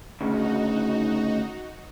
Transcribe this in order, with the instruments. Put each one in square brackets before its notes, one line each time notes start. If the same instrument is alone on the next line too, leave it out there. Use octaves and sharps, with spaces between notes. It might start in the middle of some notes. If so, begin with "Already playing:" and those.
[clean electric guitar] D2 C#3 [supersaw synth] D#4 F#4